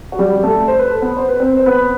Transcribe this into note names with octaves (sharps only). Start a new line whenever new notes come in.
F#4
G3 G4
A3 A4
C5
B4
A4
B3 B4
C5
B4
C4 C5
C5
B3 B4